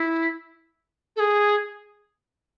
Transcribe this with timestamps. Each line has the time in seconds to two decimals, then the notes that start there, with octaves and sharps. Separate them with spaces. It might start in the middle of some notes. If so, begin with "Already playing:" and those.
Already playing: E4
1.16 A4
1.20 G#4